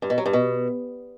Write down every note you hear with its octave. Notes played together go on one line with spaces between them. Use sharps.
G2
B2
F#3
G2
B2